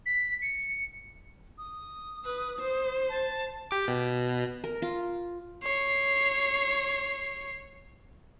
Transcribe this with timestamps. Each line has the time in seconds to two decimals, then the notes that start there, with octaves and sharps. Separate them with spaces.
0.06 B6
0.42 C#7
1.58 D#6
2.25 B4
2.59 C5
3.09 A5
3.71 G4 D6
3.88 B2
4.64 A#4
4.82 F4
5.63 C#5 C7